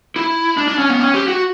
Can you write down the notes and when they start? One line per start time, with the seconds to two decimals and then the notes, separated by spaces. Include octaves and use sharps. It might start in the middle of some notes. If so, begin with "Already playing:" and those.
0.16 E4
0.58 D4
0.68 D4
0.78 C#4
0.89 B3
0.99 C#4
1.14 G4
1.28 F#4